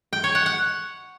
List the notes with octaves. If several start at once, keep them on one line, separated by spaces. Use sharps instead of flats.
G5
C#5
F#5
F#5